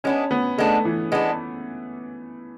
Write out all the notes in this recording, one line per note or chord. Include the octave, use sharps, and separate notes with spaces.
G#3 B3 C#4 D4
B3
G#3 A3 B3 D4
E3
G#3 B3 D4